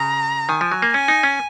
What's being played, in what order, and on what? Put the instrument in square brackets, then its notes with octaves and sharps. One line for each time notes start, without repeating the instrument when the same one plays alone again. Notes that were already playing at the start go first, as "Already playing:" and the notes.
Already playing: [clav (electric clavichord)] C#3 [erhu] A#5
[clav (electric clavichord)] D#3 [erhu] G#5
[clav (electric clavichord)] F3
F#3
A#3
[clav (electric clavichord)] C#4 [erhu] G#5
[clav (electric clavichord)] D#4
C#4